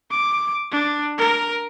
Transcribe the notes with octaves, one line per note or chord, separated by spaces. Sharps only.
D6
D4
A#4